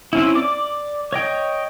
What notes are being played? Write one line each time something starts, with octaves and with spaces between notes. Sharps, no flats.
C4 C#4 E4
D5 D6
C#5 D#5 G5